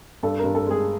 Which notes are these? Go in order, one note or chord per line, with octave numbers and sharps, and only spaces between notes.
G2 A4
G2 A#4
A4
G#3 G#4